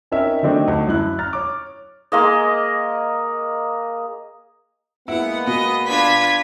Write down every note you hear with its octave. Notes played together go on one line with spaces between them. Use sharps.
C4 C#4 D#4 A#4 E5
D#3 F#3 A3 C4 D4 D#4
D2
F#2 E4 F#6
A#5 F6 A6
C#5 D6
G#3 A#3 D#5
G#3 A#3 B3 E4 F#5
B2 D#5
D4 F4 B4 G#6 B6